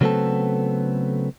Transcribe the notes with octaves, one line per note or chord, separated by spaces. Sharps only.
C#3 F#3 A3 B3 C4 A4